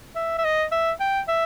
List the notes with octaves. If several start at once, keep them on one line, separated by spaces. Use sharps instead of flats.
E5
E5
D#5
E5
G5
E5